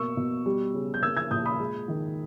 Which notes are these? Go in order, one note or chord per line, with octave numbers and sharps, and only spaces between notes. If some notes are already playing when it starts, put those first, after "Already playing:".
Already playing: B2 A#3 C#6 E6
B2
G3
C#3
G6
A#3 E6 G#6
E6 G#6
A#2 D#6 G6
B5 D#6
G#3
D#3